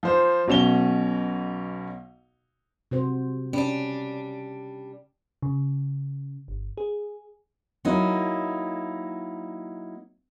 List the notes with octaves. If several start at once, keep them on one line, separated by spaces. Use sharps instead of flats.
F3 C5
B1 B2 C#4 E7 G7
C3 F#4 C5
G3 C#4 D4
C#3
G1
G#4
F#3 A#3 D#4 E4